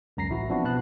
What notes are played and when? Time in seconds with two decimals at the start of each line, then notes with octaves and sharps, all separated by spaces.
0.17 C#2 F#2 A#5 A#6 C7
0.30 A1 E4 F#4
0.49 F3 B3 C4 D4 E4 F#4
0.64 B2 B3 B4 A5 F#6